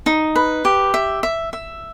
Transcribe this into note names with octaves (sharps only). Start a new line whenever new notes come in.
D#4
B4
G4
E5
E5
E5